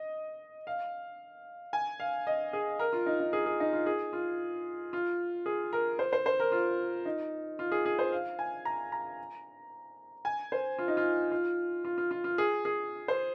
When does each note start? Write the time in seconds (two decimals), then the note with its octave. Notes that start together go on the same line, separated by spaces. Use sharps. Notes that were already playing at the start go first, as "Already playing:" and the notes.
Already playing: D#5
0.67 F5
1.73 G#5
2.00 F5
2.27 D#5
2.53 G#4
2.79 A#4
2.93 F4
3.06 D#4
3.20 D#4
3.33 G#4
3.46 G#4
3.60 D#4
3.73 F4
3.86 G#4
4.13 F4
4.93 F4
5.46 G#4
5.73 A#4
5.99 C5
6.13 C5
6.26 C5
6.40 A#4
6.52 F4
7.05 D#4
7.59 F4
7.72 G#4
7.86 G#4
7.99 C5
8.12 F5
8.39 G#5
8.65 A#5
8.92 A#5
10.25 G#5
10.52 C5
10.79 F4
10.88 D#4
10.97 F4
11.31 F4
11.85 F4
11.98 F4
12.11 F4
12.24 F4
12.38 G#4
12.65 G#4
13.08 C5